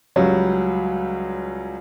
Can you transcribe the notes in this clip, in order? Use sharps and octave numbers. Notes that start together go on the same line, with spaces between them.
C#2 F#3 G3